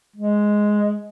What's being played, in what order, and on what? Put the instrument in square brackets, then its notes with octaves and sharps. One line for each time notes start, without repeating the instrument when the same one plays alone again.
[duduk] G#3